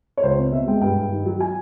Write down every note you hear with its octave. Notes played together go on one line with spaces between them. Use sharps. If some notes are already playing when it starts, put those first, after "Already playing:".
C#5
C#2 C5
C4
B2 E5
G#3 G5
G2 G5
G2
D#3
F#3
G#5